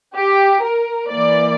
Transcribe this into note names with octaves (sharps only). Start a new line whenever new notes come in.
G4
A#4
E3 A#3 D5